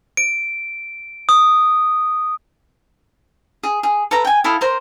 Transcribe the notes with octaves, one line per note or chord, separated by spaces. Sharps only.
D7
D#6
G#4
G#4
A4 B4 A#5
G5 G#5
E4 A4 F5 D#6
A#4 C5 A#5